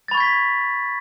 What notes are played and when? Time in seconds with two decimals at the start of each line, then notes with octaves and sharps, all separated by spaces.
0.08 A6
0.11 B5
0.14 C#6
0.17 G#6
0.20 B6